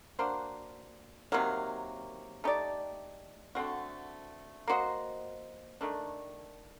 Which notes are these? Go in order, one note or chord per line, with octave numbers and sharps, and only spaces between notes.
A#3 D4 F#4 C5
C3 D#3 F#3 A#3
A3 D#4 G4 D5
D3 A3 C4 F#4
A#3 F#4 C5 D#5
D#3 A3 D4